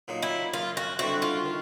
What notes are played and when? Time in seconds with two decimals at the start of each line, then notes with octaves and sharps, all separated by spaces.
0.08 A#2 F#3 A#3 D#4
0.22 E4
0.53 F#2 F4
0.77 F#4
0.99 D3 G3 C4 E4 F#4
1.22 F4
1.45 D#3